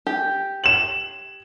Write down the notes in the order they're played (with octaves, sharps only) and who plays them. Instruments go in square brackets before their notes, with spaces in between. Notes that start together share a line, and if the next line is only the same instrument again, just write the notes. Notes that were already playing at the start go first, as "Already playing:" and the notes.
[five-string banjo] G4
[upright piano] E7 F#7